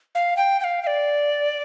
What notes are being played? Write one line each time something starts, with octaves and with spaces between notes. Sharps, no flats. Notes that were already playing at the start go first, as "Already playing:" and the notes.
F5
G5
G5
F5
F5
D5